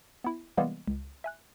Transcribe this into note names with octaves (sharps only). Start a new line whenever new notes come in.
B3 E4
C3 E3 G3 G#3 A#3 B3
C#2
E5 G#5 F#6